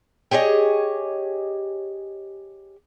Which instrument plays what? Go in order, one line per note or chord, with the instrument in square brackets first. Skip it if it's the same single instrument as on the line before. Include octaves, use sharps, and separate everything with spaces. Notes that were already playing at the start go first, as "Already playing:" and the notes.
[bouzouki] G4 G#4 C#5 D#5